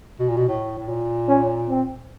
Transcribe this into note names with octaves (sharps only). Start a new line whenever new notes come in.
B2
A#2
B2
A2
A2
A#2
C#4
C4